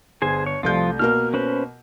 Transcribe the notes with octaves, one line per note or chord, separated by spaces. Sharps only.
G1 G#4 C5 G#5
C#5
C2 F3 A3 F4 G6
B2 A#3 A#4 F6
C#4 B4 C5